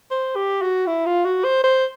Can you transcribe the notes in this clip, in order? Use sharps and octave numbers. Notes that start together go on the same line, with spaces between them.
C5
G4
F#4
E4
F4
F#4
C5
C5